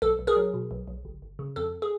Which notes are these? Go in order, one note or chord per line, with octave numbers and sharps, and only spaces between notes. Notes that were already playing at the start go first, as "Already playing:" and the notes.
B1 A4
B1
G#4 A#4
F#3
B2
B1
B1
G1
G1
C#3
F2 A4
G#4